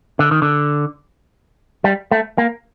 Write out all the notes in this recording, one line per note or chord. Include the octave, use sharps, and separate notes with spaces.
D3
D#3
D3
G3
A3
A#3